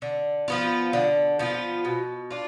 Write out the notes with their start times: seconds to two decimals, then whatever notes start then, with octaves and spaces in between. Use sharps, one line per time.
0.02 D3
0.48 F3 B3 F4
0.93 D3
1.39 F3 B3 F4
1.85 B2
2.31 D4 F4